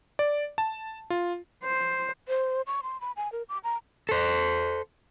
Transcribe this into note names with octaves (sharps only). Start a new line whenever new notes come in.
D5
A5
F4
C5
C5
C#6
C6
B5
G#5
A#4
D6
A#5
A4 C5